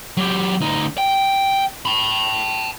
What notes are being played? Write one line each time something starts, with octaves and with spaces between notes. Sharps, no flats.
F#3 G4
D2 D#4
G5
A5 B5